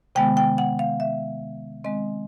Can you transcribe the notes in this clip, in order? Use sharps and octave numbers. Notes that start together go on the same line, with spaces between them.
C3 D#3 G#3 B3 G5
G5
F#5
F5
E5
D#3 G#3 C4 D#5